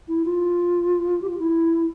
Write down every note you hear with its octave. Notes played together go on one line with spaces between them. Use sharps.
E4
F4
G4
F4
E4